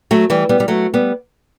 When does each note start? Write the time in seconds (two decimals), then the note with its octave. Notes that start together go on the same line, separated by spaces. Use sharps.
0.11 F#3 A3
0.30 E3 G3
0.49 G3 B3
0.60 G3
0.68 F#3 A3
0.94 G3 B3